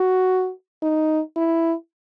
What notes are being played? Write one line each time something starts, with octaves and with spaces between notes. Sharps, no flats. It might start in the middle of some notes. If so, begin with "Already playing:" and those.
Already playing: F#4
D#4
E4